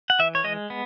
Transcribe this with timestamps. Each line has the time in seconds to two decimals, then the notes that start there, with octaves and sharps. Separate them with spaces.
0.10 F#5
0.19 E3 E5
0.35 C#5
0.44 G#3 D#5
0.70 B3